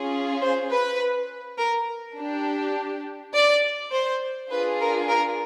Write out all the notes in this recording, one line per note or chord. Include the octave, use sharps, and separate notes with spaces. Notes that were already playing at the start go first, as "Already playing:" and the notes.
Already playing: C#4 F4 G#4
C5
B4
A#4
D4 G4
D5
C5
D4 F4 G#4 B4
A#4
A#4